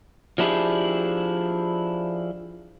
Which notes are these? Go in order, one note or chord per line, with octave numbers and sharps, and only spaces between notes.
F3 G#3 D4 E4 G4 G#4